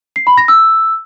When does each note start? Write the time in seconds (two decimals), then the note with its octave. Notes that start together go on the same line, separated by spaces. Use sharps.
0.16 C7
0.27 B5
0.38 A#6
0.48 E6